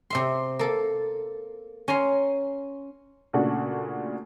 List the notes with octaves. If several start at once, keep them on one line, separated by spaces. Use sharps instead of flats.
C3 E5 C6
A#3 A4
C#4 G#5 A#5 C6
A#2 C#3 A3 D4 F#4